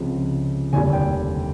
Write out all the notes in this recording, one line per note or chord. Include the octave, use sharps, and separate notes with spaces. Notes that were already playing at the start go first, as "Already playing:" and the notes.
Already playing: C#2 C3 F3
F1 D#2 D3 G3 G#5
G5